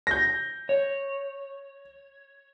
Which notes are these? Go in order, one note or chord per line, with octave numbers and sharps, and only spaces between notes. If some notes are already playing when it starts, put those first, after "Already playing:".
G6 A#6
C#5